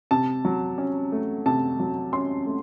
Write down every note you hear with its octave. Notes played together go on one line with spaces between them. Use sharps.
C3 A5
F#3
C#4
A3
C3 A5
F#3
C#4 C6
A3